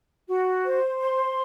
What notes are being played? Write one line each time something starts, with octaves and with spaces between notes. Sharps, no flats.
F#4
C5
C6